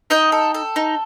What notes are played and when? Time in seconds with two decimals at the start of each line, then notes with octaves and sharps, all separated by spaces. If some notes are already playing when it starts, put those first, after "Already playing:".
0.10 D#4 D#5 G5
0.32 A4
0.54 A4
0.76 D#4